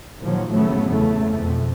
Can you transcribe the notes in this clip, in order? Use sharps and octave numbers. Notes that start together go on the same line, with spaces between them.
A#1 D#2 F3 F#3
A2 C#3 F#3 A3 B3
E2 C#3 A3
F2 B2